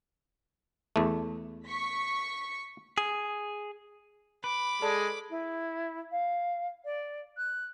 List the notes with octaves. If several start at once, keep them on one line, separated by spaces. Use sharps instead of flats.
E2 A3
C#6 B6
G#4
B4 B5 D6
G#3 A4 D5 A5
E4
F5
D5
F#6